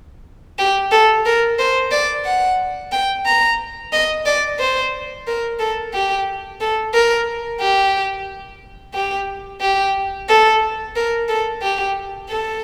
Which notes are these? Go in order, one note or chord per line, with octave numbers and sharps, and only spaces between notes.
G4
A4
A#4
C5
D5
F#5
G5
A#5
D#5
D5
C5
A#4
A4
G4
A4
A#4
G4
G4
G4
A4
A#4
A4
G4
A4